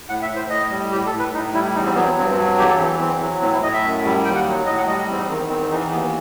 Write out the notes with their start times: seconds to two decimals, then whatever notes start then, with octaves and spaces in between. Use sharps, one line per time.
0.09 A2 F#5
0.22 E5
0.30 A2
0.36 C5
0.50 A2 D#5
0.70 G3
0.92 A2 G4
1.06 A4
1.12 A2
1.19 B4
1.33 A2 D#4
1.54 G3 E4
1.75 E2 D#4
1.86 C4
1.95 F#3 B3
2.06 C4
2.17 G2 C4
2.31 C4
2.37 F#3
2.58 E2 G4
2.68 A4
2.79 E3 C4
3.00 E2 C4
3.20 F#3
3.41 A2 C4
3.53 E4
3.62 A2 D#5
3.73 E5
3.84 F#2
4.04 G3
4.25 D#2 G5
4.35 F#5
4.46 F#3
4.66 A2 D#5
4.78 F#5
4.87 G3 D#5
4.97 D#5
5.08 E2 C4
5.18 D#4
5.29 D#3 C4
5.39 B3
5.50 E2 C4
5.61 C4
5.71 E3 D#4
5.91 D#2 B3
6.02 B3